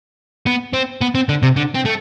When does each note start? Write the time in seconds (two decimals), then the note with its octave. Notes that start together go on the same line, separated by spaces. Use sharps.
0.46 B3
0.73 C4
1.01 B3
1.15 C4
1.29 D3
1.43 C3
1.56 D3
1.74 C4
1.85 A3